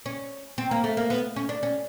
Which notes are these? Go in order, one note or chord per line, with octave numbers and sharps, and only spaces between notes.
C#4
C4
A#3
A3
A#3
B3
C#4
D4
C#4